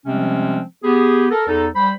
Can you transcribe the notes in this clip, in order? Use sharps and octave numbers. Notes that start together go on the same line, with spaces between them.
C3 F3 G3 G#3 C4 C#4
B3 G4 G#4
A4 A#4
E2 D#4 A4
G3 C5 B5